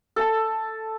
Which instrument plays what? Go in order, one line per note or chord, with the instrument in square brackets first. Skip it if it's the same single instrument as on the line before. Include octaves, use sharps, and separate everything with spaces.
[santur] A4 A5